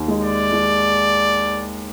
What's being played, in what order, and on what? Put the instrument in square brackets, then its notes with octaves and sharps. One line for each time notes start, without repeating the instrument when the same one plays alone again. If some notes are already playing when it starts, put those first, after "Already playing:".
Already playing: [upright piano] D#2
G#3
[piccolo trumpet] D5
[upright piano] G#3